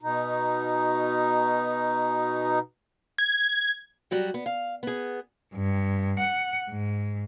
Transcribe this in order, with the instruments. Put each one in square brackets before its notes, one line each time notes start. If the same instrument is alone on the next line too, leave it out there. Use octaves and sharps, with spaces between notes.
[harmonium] B2 D#4
[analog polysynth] G#6
[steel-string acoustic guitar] F#3 G3 F#4
B3
F5
B3 G#4
[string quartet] G2
F#5
G#2